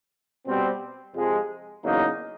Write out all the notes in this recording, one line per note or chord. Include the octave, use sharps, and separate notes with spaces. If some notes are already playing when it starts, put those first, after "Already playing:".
B2 G3 C4
F2 C3 F3 G#3
E2 C#3 F#3 A#3 D#4